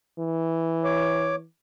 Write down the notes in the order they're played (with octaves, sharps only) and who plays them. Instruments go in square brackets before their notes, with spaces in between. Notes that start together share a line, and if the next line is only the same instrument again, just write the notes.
[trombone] E3
[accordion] C#5 D6